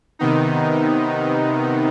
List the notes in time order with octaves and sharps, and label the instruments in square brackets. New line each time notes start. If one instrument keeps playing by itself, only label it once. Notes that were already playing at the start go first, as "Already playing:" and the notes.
[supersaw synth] C3 D#3 B3 D#4